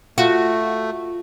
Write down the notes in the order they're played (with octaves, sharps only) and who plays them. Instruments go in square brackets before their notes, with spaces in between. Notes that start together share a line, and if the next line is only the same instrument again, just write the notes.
[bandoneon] A3 [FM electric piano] F4 [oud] F#4